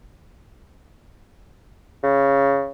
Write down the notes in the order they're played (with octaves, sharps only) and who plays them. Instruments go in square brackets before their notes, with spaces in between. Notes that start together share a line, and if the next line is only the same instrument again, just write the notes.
[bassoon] C#3